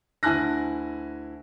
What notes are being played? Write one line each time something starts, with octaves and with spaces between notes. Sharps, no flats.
D2 E4 G#5 A5 F#6 A#6